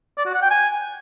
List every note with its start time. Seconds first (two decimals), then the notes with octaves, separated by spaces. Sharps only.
0.17 D5
0.26 F#4
0.34 F#5
0.42 G5
0.50 G#5